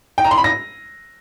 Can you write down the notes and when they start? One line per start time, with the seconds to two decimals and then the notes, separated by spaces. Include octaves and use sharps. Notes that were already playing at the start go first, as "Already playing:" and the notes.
0.18 G5
0.24 A#5
0.31 C6
0.38 B5
0.44 A#6